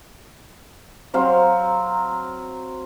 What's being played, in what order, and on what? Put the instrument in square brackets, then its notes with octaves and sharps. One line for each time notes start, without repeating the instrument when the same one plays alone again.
[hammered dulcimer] F#3 C4 F5 C6